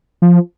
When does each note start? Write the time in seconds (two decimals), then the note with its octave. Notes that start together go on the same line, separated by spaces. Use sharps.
0.22 F3